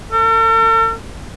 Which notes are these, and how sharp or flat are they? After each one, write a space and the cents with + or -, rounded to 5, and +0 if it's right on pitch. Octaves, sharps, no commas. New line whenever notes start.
A4 +45